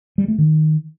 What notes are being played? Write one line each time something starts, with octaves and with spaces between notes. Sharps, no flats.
G3
A3
D#3